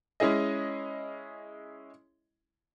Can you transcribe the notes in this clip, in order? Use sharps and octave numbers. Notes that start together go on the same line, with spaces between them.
G#3 C#4 E4 G#4 D#5